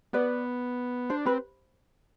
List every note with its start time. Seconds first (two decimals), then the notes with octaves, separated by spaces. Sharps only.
0.13 B3 B4 D5
1.10 D4 C5
1.26 C4 B4